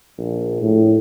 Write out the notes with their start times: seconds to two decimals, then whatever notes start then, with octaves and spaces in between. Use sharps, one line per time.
0.18 A#1
0.62 A2